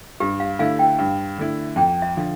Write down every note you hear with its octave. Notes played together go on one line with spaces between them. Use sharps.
G2 G4
F5
D3 A3 E4 F5
G5
G2
D3 A3 E4
F2 G5
E5
D3 F3